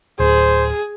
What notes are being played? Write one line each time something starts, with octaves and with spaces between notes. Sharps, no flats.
D1 G#4 C5